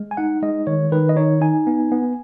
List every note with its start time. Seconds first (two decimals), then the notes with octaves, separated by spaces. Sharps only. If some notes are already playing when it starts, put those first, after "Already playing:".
Already playing: G#3
0.11 G#5
0.17 D#4 F#5
0.42 G#3 D#5
0.67 D#3 C#5
0.92 D#3 B4
1.09 D#5
1.16 D#4 C#5
1.41 D#4 G#5
1.67 B3
1.92 B3